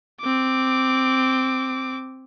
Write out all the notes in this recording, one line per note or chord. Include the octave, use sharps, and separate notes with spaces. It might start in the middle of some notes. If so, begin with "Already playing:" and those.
C4 D6